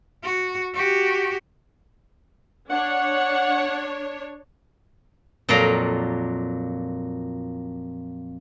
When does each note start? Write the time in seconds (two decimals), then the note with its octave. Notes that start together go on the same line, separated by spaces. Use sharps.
0.23 F#4
0.75 F#4 G4
2.71 D4 C#5 F#5
5.49 F2 A#2 F#3 D5 F5 A#5